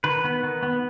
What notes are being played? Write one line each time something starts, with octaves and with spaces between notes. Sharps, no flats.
D#3 B4
B3
D#3
B3